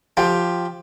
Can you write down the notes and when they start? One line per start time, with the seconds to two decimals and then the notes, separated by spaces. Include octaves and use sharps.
0.17 F3 G4 G5